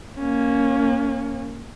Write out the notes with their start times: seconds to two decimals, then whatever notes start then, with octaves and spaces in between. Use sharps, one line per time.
0.19 A#3 C#4